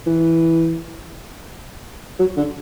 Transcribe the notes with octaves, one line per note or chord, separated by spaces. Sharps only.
E3
F#3
D3